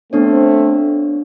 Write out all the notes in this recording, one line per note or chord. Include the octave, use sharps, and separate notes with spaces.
A3 B3 C4 D4 C#5